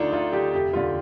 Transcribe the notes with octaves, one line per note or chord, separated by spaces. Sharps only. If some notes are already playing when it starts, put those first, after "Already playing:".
Already playing: D2 D3 D4 D#4 F4
D2 F4
D3 G4
F1 G4
D#2 D3 F4